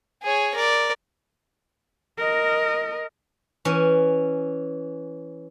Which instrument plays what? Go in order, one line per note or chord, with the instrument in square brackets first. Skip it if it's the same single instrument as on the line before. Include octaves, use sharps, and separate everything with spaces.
[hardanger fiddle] G#4 C#5
A#4 D5
[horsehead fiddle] A#4 D#5
[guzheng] E3 C#4